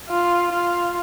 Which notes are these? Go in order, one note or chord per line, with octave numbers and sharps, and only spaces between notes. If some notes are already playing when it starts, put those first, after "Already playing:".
F4
F4